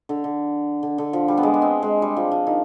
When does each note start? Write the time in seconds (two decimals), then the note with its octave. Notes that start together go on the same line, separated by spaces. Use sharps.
0.09 D3
0.24 D3
0.83 D3
0.98 D3
1.13 F3
1.28 G3
1.37 B3
1.43 G#3
1.54 D4
1.62 C4
1.83 G#3
2.02 G3
2.17 F3
2.31 F3
2.47 D#3